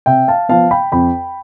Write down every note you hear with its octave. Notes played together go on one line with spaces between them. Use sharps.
C3 E5 G5
F5 A5
F3 B3 F5 A5
G5 B5
F2 G5 B5